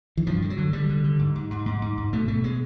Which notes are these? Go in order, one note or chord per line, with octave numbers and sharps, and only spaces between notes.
E3
G2 F3
D3
F#3
D3
D3 G3
D3
D3
G#2
G#2
G#2
G#2
G#2
G#2
B2 A3
B2 A3
G#3